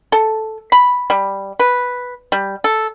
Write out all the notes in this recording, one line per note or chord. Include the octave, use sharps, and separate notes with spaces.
A4
B5
G3
B4
G3
A4